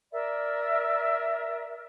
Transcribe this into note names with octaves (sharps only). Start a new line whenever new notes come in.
A#4 D5 E5